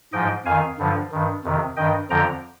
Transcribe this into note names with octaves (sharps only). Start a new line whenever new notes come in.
G#2 F3 D#5 G5
F2 D#3 F5 G#5
G2 D3 F3
G2 D#3
F2 C3 D#3
G2 D#3 D#5 G5
F2 D3 F3 G5 A#5